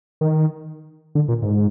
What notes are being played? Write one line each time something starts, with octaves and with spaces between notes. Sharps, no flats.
D#3
D3
A#2
G#2